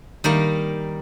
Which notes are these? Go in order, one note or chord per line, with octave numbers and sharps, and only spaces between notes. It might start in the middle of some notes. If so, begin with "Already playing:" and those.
D#3 G3 A#3